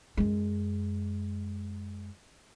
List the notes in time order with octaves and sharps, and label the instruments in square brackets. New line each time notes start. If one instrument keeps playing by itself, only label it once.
[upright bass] F#2 G#3